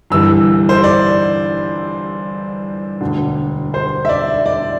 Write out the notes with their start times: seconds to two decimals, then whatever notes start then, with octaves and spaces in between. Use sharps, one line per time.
0.10 G1 G2 E3 E6
0.69 C5
0.84 D5
3.01 E1 D2 D3
3.74 C5
4.05 E5
4.09 D5
4.46 D5